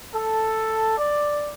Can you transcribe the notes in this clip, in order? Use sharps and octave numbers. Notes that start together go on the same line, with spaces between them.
A4
D5